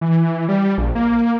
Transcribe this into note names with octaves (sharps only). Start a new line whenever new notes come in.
E3
G3
A#1
A#3